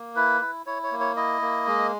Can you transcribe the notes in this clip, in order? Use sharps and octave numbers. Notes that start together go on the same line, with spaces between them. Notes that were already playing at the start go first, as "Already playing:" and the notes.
Already playing: A#3
E4 B4
E4
E4 C#5
C#5
A#3
C#5
E4 D#5
A#3
G#3